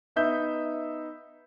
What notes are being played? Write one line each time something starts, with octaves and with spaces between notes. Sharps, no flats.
B3 D#4 E5 G6